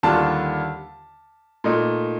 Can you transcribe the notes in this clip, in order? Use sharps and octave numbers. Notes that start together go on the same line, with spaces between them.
D#2 D3 G3 D4 F4 A5
A#2 A3 D#4